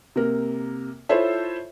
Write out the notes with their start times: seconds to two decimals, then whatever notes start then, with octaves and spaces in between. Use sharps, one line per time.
0.16 C3 A#3 A#4
1.09 E4 F4 A4 C5 C#5 E5